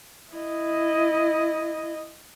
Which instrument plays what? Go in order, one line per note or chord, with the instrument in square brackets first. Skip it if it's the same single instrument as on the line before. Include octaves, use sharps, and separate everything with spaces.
[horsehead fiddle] E4 D#5